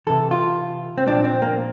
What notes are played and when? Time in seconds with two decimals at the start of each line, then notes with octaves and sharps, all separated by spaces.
0.07 C3 E3 A4
0.31 F4
0.98 C4
1.07 A#2 F3 D4
1.24 C4
1.42 A#3